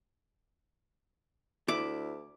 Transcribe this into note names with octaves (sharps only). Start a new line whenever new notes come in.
D2 E4 D6